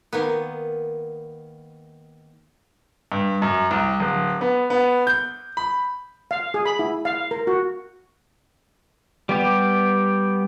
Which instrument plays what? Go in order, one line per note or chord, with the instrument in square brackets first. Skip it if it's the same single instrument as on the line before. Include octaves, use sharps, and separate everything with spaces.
[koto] D#3 A#3 B3
[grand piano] G2
F#2
C2
D1
B3
B3
G6
B5
[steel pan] F5
G#4
B5
E4
F5
A#4
F#4
[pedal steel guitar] G3 B3 G4